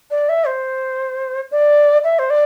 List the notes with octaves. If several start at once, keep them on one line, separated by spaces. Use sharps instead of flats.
D5
E5
C5
D5
E5
C5
D5